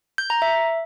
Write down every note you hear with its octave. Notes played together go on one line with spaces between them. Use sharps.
G6
A#5
E5